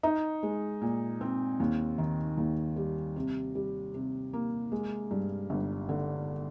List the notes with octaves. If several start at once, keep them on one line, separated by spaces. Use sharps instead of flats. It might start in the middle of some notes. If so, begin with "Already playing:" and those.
D#4
G#3
A#2
C4
D#2
D#3
D#2
G3
C3
G3
C3
A#3
G#3
G2
G1
D3